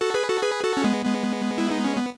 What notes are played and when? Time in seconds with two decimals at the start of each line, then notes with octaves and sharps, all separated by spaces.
0.01 F#4 A4
0.14 G#4 B4
0.28 F#4 A4
0.42 G#4 B4
0.64 F#4 A4
0.77 C#4
0.84 G#3 B3
1.05 G#3 B3
1.58 E4
1.71 D#4
1.84 C#4
1.97 B3